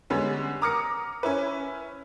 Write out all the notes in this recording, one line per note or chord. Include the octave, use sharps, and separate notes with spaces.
D3 G3 G#3 B3 C#4
A#5 D6 D#6 F6 A#6 C#7
C#4 E4 B4